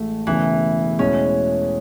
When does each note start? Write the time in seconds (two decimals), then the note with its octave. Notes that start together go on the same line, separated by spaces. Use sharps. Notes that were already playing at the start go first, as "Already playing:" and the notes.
Already playing: A1 A2 G#3 A3
0.27 E1 E2 C#3 E3
0.99 E2 B2 G#3 C#4